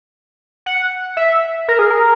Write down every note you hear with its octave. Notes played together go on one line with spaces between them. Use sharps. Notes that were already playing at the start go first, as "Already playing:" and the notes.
F#5
E5
A#4
G#4
A#4